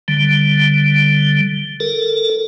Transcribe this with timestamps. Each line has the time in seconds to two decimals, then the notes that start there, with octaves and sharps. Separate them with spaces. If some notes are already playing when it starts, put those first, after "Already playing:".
0.08 D3 G3
1.80 A4 A#4